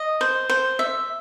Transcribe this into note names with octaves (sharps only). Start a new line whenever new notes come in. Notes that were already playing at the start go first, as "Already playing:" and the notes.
Already playing: D#5
C5
C5
E5